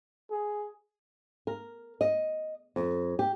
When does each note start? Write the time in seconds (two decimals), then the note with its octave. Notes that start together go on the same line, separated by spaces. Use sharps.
0.31 G#4
1.47 A#4
2.01 D#5
2.76 F2
3.19 G4